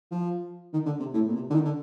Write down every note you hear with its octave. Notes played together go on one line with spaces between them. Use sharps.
F3
D#3
D3
C3
A2
A#2
C3
D3
D#3
D3